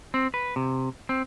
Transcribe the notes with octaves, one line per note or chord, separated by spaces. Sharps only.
C4
B4
C3
C4